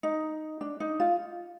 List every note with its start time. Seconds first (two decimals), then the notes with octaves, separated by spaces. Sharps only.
0.03 D#4
0.61 D4
0.80 D#4
1.00 F4